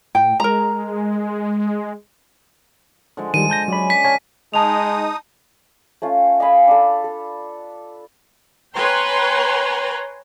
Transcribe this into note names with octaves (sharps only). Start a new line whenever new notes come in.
A2 G5
G#3 A#4 A#5
D3 F3 G#3
D#3 G3 D#7
A5 G6 A#6
F#3 C#4 D5 G#5 B5
B6
C#5 F5 G#5 A5
G#3 D#4 A5 D#6 F7
A3 C#4 F4
D#5 F5 G#5 B5
D4 A4
A4
B4 C#5 G5 G#5 A#5 C6